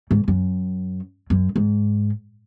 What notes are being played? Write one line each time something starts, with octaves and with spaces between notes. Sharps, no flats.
G#2
F#2
F#2
G#2